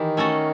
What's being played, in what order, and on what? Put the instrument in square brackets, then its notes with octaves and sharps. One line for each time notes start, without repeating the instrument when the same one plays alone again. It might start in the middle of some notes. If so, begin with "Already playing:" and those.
Already playing: [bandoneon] D#3 [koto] E3 G4
[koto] A3 C#4 F#4 A4